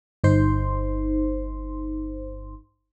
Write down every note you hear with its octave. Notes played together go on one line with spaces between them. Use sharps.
G1 D#4 C5 C6